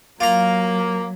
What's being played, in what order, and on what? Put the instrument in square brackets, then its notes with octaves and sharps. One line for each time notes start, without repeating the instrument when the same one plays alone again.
[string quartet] F#3 [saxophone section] A#3 [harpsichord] F4 A#5